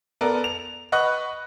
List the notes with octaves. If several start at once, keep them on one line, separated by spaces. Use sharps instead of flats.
B3 A4 A#4 D5
F7
B4 D#5 F#5 C#6 F#6